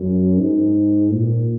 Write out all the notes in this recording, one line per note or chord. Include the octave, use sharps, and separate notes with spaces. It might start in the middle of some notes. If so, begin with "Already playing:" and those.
Already playing: F#2
G#2
A#2